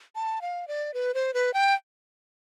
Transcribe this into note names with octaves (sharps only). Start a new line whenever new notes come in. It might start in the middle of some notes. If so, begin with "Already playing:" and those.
A5
F5
D5
B4
C5
B4
G5